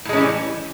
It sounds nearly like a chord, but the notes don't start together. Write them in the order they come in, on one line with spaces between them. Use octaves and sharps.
A2 G#3 C#4 E3 G3